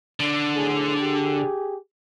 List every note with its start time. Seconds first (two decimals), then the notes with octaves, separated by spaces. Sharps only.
0.20 D3
0.54 B1 A2 G#4
1.00 G4 G#4